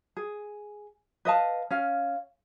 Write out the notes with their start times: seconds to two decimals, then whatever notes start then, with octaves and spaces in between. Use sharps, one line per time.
0.17 G#4
1.25 B4 D#5 F5 A5
1.71 C#4 F5